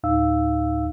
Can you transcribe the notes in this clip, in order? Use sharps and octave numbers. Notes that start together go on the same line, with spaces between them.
D2 A2 D#4 F5 E6